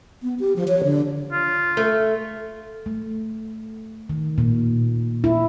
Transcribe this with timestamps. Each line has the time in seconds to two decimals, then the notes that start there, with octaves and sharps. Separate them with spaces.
0.23 B3
0.40 G4
0.56 F3
0.68 C#5
0.84 D3
1.32 F4
1.77 A3
2.86 A3
4.09 D#3
4.38 A#2
5.24 E4